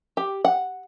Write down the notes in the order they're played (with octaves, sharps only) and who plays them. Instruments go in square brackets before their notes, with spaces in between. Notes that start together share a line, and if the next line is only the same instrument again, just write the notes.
[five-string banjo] G4
F#5